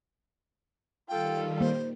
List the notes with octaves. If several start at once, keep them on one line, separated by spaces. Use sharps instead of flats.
D#3 G3 F4 A4 G5
A#3 C5